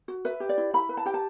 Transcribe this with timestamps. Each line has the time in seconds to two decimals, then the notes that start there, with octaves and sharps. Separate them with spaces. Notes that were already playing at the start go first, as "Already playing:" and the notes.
0.08 F#4
0.25 B4 E5
0.40 G4
0.49 D5
0.58 E4
0.74 E4 B5
0.89 B4
0.97 A5
1.06 G4 G5
1.14 A5